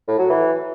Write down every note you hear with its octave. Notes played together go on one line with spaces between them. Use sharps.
A2
F#3
E3